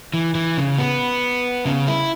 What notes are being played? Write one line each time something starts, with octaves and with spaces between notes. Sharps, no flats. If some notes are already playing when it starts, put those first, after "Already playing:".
E3
E3
C#3
B3
C#3
E4